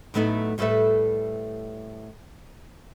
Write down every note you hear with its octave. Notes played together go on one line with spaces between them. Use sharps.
A2 F#3 A3 B3 D#4 E4
A2 G3 A3 A4 B4 E5